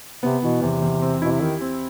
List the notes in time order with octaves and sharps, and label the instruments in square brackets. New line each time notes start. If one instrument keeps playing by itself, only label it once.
[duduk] C3 [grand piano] B3
[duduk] B2 [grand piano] E3
[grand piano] E2 [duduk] C3
[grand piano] E2
C4
[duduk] B2 [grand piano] E4
[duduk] C3
[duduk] D#3 [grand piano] G4
[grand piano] C4